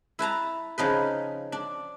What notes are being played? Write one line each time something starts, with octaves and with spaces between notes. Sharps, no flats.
E4 B4 A5 A#5
C#3 F3 D#4 B4
D4